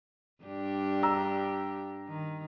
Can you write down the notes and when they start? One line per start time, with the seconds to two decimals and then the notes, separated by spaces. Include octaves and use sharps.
0.43 G2 D4 G4
1.03 A#5 E6
2.08 D#3